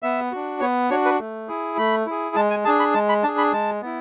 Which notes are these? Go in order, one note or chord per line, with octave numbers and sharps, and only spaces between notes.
B3 E5
D4 F#4
B3 C#5
D4 F#4 C#5
B4
A3
E4 G#4
A3 B5
E4 G#4
G#3 A5
G#5
D4 G#4 A5
B5
G#3 A5
B5
D4 G#4 A5
B5
G#3 A5
B3 E4